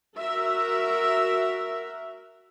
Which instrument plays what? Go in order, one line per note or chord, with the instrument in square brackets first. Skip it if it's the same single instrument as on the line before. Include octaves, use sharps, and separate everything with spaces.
[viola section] F#4 A#4 E5